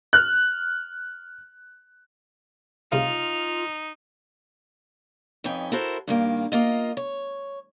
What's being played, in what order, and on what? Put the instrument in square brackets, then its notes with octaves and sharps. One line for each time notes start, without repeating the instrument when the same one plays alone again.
[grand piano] F6 F#6
[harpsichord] C2 C#3 A3 [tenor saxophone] D#4 [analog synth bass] F4 [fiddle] F6
[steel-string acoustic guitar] F2 C#4 D#4 B4 G5 G#5
E4 F#4 A4 A#4 C5
G2 D#3 A#3
A#3 F4 D#5
C#5